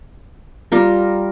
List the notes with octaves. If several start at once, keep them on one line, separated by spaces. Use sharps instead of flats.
G3 F4 A#4